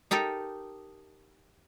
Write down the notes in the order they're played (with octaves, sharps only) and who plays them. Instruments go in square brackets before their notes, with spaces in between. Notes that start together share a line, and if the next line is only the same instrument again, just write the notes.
[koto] D#4 G4 A4 A#4